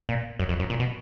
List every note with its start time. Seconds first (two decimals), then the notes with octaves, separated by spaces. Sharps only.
0.09 A#2
0.39 F#2
0.49 F2
0.59 F#2
0.70 A#2
0.80 B2